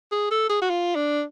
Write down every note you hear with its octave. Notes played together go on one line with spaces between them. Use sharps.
G#4
A4
G#4
F#4
F4
D4